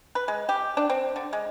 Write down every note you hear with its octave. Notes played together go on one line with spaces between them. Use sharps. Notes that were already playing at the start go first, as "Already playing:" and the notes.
B4
G#3
G4
D4
C4
D3
G#3